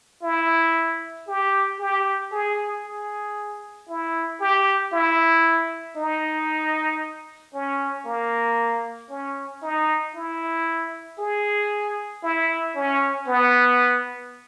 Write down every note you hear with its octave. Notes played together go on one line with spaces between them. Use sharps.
E4
G4
G4
G#4
G#4
E4
G4
E4
D#4
C#4
A#3
C#4
D#4
E4
G#4
E4
C#4
B3